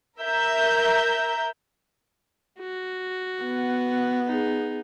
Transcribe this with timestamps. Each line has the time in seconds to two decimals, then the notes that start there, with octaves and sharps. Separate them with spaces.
0.19 A#4 E5 A#5 G6
2.59 F#4
3.42 B3
4.27 D#4 G#4